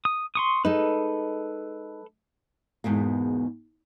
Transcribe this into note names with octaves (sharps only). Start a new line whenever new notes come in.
D#6
C6 C#6 D#6
G#3 D#4 A4 B4
E2 G#2 B2 A#3